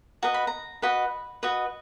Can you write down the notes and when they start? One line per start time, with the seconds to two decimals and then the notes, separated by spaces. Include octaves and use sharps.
0.23 F#4 B4 D#5 A#5
0.34 B5
0.47 A#5
0.82 F#4 B4 D#5 B5
1.43 F#4 B4 D#5